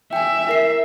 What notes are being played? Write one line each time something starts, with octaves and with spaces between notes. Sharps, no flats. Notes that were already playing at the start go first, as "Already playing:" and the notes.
E5 G5 G#5
E4 A#4 C7